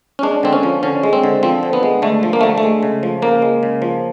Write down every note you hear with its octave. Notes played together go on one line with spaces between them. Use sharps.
C#4
G#3 D4
D3 C4
C#4
F3
D3 C#4
G#3
C4
D3
F3 C4
D3
B3
G#3
D3 A3
F3
A#3
D3 A3
A3
G#3
C#3
F3
C#3 A#3
G#3
C#3
F3